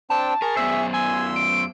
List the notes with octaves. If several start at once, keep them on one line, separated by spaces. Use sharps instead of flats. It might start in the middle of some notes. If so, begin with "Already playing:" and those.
C4 D4 G5 A5
G#4 A#4 C#6
F#2 B3 C5 E5
G#5 C6 E6
D7